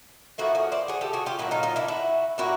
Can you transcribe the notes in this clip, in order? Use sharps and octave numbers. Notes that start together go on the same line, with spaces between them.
A2 F3 A#3 E4 F#4
F#4 G#4
C5 D5
F#4 G#4
G4 A4
F#4 G#4
F4 G4
A#2 F#3 A#3 E4 F#4
D#4 F4
D#4 F4
D4 E4
E4 F#4
A#2 G3 A#3 E4 F#4